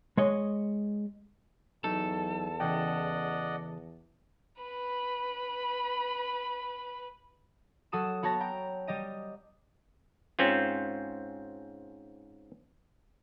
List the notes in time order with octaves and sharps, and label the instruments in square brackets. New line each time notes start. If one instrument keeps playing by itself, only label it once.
[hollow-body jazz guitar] G#3 C#5 D#5
[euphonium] E2 [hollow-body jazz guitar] F#3 D#4 [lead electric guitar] A4
[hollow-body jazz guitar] C#3 E3 G5 [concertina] D5 D#5 F#5
[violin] B4 B5
[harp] F#3 F#4 A4 D#6 D#7 E7
B3 F#4 C#5 A5 A#6
G5 A#5
G3 G4 D#5 D#7
[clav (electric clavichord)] G#2 C4 C#4 F4